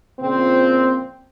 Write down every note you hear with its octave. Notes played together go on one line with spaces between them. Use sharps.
A#2 C#3 F3 C4